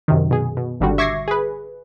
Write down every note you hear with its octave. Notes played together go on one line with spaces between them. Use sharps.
F#2 C3 D#3
B2 G#4
B2
G#1 D3 G3 F#4
E5 C#6 D6 G#6 A#6 C7
G#4 B4